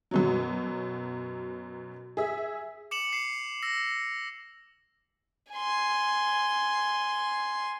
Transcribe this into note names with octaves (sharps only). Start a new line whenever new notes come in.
F#2 B2 F#3
G#4 E5
D6 C#7 E7 F#7
C7 E7
E6 A#6
G#5 C6